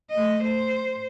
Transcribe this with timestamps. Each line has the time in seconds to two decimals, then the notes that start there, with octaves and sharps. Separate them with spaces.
0.11 A3 D#5
0.44 C5